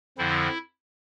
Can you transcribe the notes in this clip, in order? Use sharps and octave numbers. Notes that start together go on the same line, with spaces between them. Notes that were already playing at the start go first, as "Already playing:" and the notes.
F2 D3 F3 C4 E4